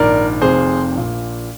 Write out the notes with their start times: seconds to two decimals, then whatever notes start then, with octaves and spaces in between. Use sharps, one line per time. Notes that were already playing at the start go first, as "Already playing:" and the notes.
Already playing: A#1 G#2 D#3 A#4 D5
0.41 F1 F2 C3 D#3 G#4 C5
0.95 A#1 A#2